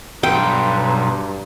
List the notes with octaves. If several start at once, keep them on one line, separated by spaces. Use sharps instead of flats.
B1 G2 B4 G5 A#5 C6